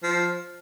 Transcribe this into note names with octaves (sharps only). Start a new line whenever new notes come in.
F3